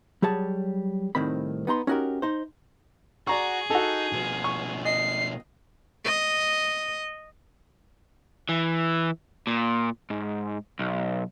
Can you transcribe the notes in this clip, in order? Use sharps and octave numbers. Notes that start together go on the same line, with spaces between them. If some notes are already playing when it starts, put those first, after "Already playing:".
F#3 G3 G#4 C#5 A5
C2 A2 D#3 C4 B5
B3 D#4 A#5 C6
C#4 D#4 F#4 G4 A#4
D#4 C5
F#4 G#4 D5 A#5 C#6
D#4 F#4 A4
B2 F3
C#6
D#5 C7
D#5
E3
A#2
G#2
B1